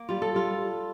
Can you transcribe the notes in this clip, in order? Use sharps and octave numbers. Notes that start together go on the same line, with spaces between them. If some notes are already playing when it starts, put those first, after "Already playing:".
Already playing: A#3
G3 F4
A4
G3 F4